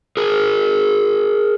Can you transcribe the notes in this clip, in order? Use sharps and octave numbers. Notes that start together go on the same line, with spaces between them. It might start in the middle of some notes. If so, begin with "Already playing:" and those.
G#4 A#4